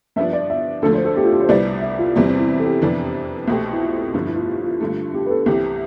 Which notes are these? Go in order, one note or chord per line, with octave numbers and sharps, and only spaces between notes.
G2 F3 B3 D4 E5
D5
E5
D2 D3 F3 A3 A4
C5
A4
G4
F4
G4
C5
C2 C3 G3 B3 E4 D5
E5
F4
E2 C3 E3 G3 C4
C4
E4
A4
G4
F2 C3 E3 B3 D4 B4
G4
C2 B2 A3 C4 G4
E4
F4
G1 G2 D3 F3
E4
F4
G4
F4
G2 D3 A3 F4
G4
B4
A4
C2 C3 E3 G4